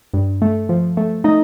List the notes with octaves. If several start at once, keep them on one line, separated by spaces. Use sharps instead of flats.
G2
A3
F3
A3
A3 D#4 D#5